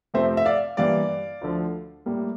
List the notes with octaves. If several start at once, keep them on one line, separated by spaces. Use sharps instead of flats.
F2 C3 F3 A3 C4 C5 E5
E5
D5 F5
G2 E3 G3 A#3 D5 F5
D2 D3 F3
A2 G3 A#3